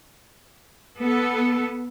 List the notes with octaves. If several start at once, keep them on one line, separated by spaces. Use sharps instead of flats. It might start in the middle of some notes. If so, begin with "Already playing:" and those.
B3 A4